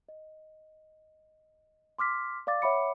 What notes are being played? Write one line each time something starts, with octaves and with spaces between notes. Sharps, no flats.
D#5
C6 D6 F6 B6
D5 F5 D6 A6
C#5 E5 F#5 B5 D6 C#7